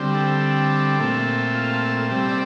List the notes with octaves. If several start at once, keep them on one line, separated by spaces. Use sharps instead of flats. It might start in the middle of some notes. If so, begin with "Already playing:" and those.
Already playing: D3 G3 C4
A4
A#2 A3 C4
F4
A4
C3 G3 C4 A4
D5